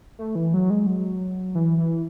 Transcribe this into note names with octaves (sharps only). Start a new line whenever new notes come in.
A3
E3
F#3
G#3
F#3
E3
E3